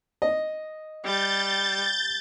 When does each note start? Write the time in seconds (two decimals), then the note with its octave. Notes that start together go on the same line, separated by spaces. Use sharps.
0.22 D#5
1.04 G3 G6 A6